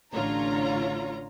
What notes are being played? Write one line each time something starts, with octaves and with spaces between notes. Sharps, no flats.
A1 D3 F4 C#5 A#5